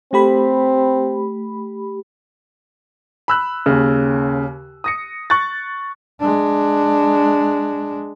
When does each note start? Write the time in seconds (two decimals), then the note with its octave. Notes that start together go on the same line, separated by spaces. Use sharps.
0.13 A3 C4 G4 B5
3.28 B5 E6 F#6
3.66 D#2 C#3
4.84 D#6 A#6 C#7
5.30 C#6 F#6 A6
6.20 G#3 D4